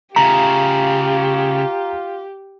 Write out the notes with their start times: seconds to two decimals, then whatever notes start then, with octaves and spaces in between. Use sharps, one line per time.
0.16 C#3 A3 F4 G4 A#5